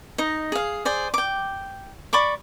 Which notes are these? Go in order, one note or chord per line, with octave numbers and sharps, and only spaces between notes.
D#4 D#5
G#4 F5
G#4 C5 D5
G5 D6
D5 B5 C#6 D6